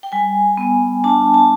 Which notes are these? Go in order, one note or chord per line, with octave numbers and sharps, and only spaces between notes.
G5
G3 G#5
B3
D4 A5
A5